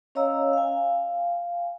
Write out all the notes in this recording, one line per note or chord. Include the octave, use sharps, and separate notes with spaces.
C#4 C#5 D#5 F5 A#5 E6
F5 G#5